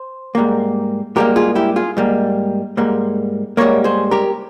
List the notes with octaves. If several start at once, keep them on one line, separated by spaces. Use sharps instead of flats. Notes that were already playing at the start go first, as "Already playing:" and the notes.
Already playing: C5
G#2 G3 A#3
G#2 G3 A#3 G4 A#4
F4 G#4
E4 G4
F4 G#4
G#2 G3 A#3
G#2 G3 A#3
G#2 G3 A#3 A#4 C#5
G#4 C5
G4 A#4